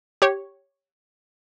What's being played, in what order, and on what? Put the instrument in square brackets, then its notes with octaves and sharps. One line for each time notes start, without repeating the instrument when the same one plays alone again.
[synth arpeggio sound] G4 C#5